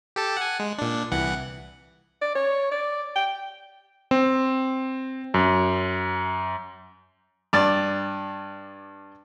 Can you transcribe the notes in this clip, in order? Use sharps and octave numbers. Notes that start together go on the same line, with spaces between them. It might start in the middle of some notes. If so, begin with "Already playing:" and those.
G4 A4 A5
F#5 G#5
G#3
A#2 D4
C2 E3 F#5
D5
C#5
D5
G5
C4
F#2
G2 D5